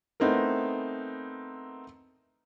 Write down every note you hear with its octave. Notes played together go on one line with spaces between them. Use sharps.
A3 B3 C4 D#4 E4 A#4